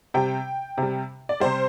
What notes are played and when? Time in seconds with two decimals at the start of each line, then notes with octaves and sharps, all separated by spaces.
0.14 C3 G3 G5
0.78 C3 G3
1.29 D5
1.40 C3 G3 C5